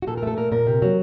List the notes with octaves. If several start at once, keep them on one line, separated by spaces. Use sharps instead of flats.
F#4
A#2 A4
A#4
A3 A4
A#2 A#4
A#2 A#4
C3
F#3